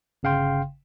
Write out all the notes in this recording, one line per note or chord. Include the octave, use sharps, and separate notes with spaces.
G1 C#3 F5 G5 C6